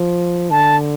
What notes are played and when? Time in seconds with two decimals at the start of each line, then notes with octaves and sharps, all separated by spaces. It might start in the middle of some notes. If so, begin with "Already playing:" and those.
Already playing: F3
0.51 D3 A5